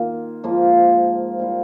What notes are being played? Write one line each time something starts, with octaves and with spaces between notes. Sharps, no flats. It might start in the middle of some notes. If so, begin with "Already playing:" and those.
Already playing: D#3 A#3 F4 A#4
G#2 F3 A#3 F4
G3 A#3 F4